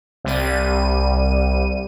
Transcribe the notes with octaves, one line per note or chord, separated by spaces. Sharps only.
C2 G3 D#7